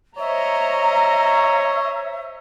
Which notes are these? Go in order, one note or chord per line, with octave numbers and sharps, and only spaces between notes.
C5 C#5 D#5 E5 A#5